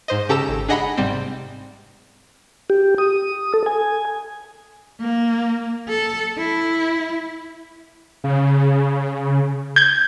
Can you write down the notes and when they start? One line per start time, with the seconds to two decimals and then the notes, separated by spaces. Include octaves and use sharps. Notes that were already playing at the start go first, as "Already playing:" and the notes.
0.08 G#2 C5 D#5
0.29 C#3 G4 A4 A#5 E6 E7
0.49 G#1
0.69 D4 G#4 D#5 F#5 A#5 B5
0.97 G#2 C3 G3 C4
2.70 G4
2.98 D#6
3.54 A4
3.66 G#5
5.00 A#3
5.89 A4
6.38 E4
8.24 C#3
9.76 G6 G#6